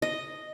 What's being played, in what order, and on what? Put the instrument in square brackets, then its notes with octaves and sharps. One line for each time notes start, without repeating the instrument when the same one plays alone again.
[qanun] D#5